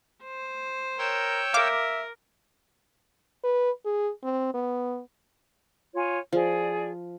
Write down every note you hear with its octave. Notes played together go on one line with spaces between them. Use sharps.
C5
A#4 C#5 G5 E6
A#4 E5 F5 D6
B4
G#4
C4
B3
F4 C#5 G#5
F3 G#4 D5